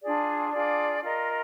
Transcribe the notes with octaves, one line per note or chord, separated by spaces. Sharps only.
D4 F4 G#4 D5
D4 F4 G#4 D5
F4 A#4 D#5